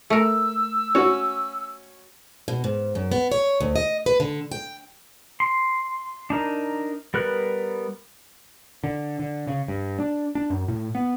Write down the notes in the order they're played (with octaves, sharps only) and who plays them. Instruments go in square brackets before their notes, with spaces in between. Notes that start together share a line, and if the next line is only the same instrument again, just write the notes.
[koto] A3 A#4 [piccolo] E6
[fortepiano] C#4 F#4 [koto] C#5
[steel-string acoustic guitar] B2
G#2
F#2
B3
C#5
D2
D#5
B4
D3
G5
[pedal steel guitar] C6
D4 D#4 A#4
G3 B3 A#4 B4 F#6
[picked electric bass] D3
D3
C#3
G2
D4
D4
F#2
A2
B3